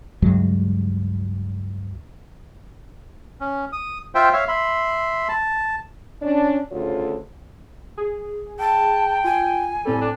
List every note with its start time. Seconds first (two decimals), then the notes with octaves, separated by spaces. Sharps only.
0.22 C#2 G2 F#3 G#3
3.40 C#4
3.72 D#6
4.15 F4 C5 E5 G5
4.33 C#5 E5 F5
4.48 E5 B5 C6
5.28 A5
6.22 C#4 D4
6.72 D2 C#3 F4 A4 C#5
7.97 G#4
8.59 G5 A5
9.24 F4 G#5
9.85 A2 G3 C4 A4
10.01 D4